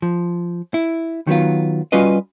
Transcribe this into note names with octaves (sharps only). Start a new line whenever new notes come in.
F3
E4
D#3 F#3 B3 F4
G3 C#4 F4 F#4 B4 D#5